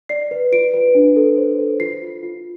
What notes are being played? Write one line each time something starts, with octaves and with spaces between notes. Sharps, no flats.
D5 C7
B4
F4 D7
B4
D4
A4
C5
A4
F4 C7
F4
F4